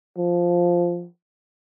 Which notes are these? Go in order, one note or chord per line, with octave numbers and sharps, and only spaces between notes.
F3